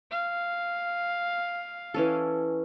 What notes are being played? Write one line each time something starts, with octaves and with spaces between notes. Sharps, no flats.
F5
E3 C#4 A4